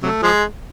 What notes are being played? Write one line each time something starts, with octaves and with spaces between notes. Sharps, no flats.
C3 F#3 A3
F3 G#3